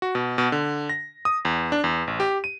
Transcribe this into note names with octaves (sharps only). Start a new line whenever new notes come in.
F#4
B2
B2
D3
A#6
D#6
E2
D4
E2
A1
G4
D#7